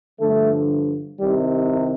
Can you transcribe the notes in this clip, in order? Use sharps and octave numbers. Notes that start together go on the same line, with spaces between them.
G2 D3 F3 A3
C2 C3 D#3 G3